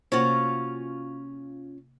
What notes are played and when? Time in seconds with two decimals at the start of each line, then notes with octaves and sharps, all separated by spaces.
0.12 C3 A#3 C#4 F4 F#4 C5